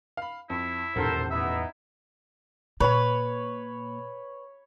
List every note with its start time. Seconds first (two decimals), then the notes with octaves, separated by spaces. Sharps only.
0.17 F5 B5
0.50 F2 E4
0.96 D#1 B1 E2 A2 A4 A#4 C5
1.31 B3 D#4 E4 E5
2.80 A#2 B4 C#5 B5